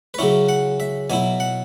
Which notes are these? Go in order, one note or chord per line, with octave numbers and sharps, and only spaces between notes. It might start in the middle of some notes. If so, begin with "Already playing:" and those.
B4
C#3 F#3 C#4 E4 C#5
F#5
E5
B2 F#3 E4 G#5
F#5